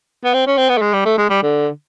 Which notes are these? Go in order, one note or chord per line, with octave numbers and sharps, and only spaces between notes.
B3
C4
C#4
C4
B3
A3
G#3
G3
A3
G#3
G3
D3